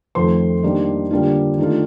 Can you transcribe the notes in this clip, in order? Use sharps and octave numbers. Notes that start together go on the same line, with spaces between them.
F2 D#3 A3 C5 C6
D#3 G3 A#3 D4
D3 G3 A#3 D4 F4
D#3 A3 D4 F4